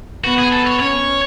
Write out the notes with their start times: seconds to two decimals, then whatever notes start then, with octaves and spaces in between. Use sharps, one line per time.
0.24 B3 F#4
0.38 G#4
0.52 A4
0.67 C#5
0.80 C#4 C#5